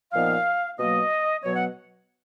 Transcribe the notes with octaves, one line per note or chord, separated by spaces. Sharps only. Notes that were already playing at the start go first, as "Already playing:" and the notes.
A#2 F3 B3 D#4 F5
B2 F#3 A#3 D#5
B2 F#3 B3 C#5
F#5